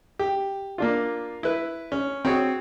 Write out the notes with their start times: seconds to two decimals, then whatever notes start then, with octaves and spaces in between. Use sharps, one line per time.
0.19 G4
0.78 A#3 D4 F4
1.43 E4 B4
1.92 C#4
2.25 C4 F#4 G#4 C#5